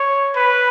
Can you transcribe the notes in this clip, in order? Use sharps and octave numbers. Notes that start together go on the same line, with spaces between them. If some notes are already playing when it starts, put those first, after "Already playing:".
Already playing: C#5
B4